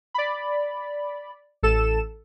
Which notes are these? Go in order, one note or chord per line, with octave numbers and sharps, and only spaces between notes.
D5 B5
A1 A4 E7